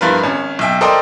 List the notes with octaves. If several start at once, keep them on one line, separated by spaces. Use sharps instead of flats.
G2 F3 E4 F4 A#4 B4
G#1 C#4
B1 E5 G5
A4 A#4 C5 D5 D#5 G5